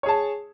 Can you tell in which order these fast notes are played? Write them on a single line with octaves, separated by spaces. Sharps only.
C#5 G#4 A5